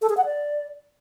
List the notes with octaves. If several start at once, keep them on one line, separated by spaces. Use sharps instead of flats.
A4
G#4
F#5
D5